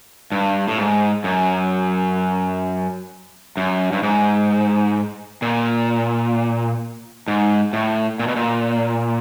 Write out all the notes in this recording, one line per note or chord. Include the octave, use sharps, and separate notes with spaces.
G2
A2
G#2
F#2
F#2
G2
G#2
A#2
G#2
A2
A#2
B2
A#2